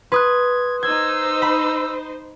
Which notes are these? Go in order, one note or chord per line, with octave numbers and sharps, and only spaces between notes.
B4 C6 D#6 F#6 G#6
D#4 C5 E6 G#6
B5